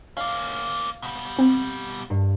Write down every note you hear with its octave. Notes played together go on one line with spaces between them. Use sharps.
A#3 C#4 F5
B2 G3
C4
G2